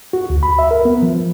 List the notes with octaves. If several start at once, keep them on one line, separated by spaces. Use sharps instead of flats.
F#4
D2
B5
E5
A#4
B3
F3